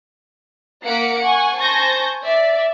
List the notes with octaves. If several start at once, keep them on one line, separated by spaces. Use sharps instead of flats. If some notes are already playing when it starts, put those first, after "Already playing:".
A#3 F5 F#5 B6 C#7 D7
F#5 G#5 C#6
C5 G#5 A5 C#6 G6 A#6
D5 E5